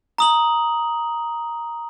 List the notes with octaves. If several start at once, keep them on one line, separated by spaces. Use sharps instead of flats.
A#5 D#6 F#7